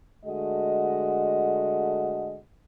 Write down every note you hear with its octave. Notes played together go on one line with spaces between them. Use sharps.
D3 G#3 A3 F#4 D#5